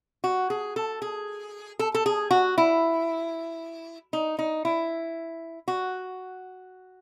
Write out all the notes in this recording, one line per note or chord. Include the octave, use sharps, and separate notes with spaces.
F#4
G#4
A4
G#4
A4
A4
G#4
F#4
E4
D#4
D#4
E4
F#4